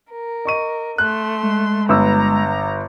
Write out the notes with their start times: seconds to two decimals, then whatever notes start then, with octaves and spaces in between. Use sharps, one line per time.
0.12 A#4
0.45 D#5 C#6 D#7
0.98 A3 C6 F#6
1.43 G#3
1.89 G1 B4 A#5 E6